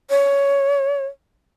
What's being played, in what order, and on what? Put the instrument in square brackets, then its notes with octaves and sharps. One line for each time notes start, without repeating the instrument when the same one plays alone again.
[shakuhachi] C#5